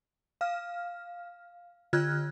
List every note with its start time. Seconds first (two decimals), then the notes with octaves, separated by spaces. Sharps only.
0.41 F5 F6
1.93 D3 F4 F6 F#6 G#6